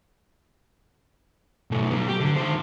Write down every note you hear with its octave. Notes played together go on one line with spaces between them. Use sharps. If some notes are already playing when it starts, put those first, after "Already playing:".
B1 A3
F#3 B3
G4
D3
D#3 C5